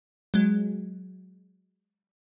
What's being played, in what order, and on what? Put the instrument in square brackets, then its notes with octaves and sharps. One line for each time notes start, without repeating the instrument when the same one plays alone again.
[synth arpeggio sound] F#3 G#3